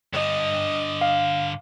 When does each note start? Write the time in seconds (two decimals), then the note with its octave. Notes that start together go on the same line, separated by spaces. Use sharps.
0.13 G2 D3 D#5
1.01 F5